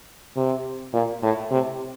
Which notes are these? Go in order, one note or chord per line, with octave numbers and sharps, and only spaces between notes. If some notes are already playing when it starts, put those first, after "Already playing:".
C3
A#2
A2
C3